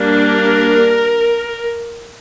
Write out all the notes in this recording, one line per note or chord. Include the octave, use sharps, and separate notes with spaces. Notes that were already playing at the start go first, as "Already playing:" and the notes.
Already playing: G3 A#3 D4
A#4